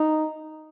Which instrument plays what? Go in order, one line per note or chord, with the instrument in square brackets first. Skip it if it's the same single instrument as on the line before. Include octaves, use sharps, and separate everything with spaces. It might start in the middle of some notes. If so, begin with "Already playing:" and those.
Already playing: [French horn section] D#4